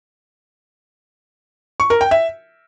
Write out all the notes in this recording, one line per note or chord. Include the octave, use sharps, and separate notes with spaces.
C#6
A#4
G5
E5